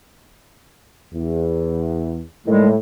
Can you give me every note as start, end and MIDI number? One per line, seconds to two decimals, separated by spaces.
1.13 2.21 40
2.47 2.75 45
2.47 2.69 51
2.47 2.69 55
2.47 2.69 56